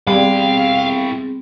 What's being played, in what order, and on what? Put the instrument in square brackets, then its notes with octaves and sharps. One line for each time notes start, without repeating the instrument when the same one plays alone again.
[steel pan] G3 [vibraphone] B3 C4 G#4 [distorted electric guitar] E4 G5 [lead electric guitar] F5